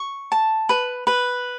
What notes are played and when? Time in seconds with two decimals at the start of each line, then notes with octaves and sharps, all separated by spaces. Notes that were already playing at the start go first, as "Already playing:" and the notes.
Already playing: C#6
0.32 A5
0.69 B4
1.07 B4